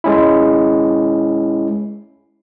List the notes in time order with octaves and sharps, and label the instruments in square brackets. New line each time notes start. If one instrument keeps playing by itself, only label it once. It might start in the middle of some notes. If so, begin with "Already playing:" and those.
[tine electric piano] G#3 C#4 E4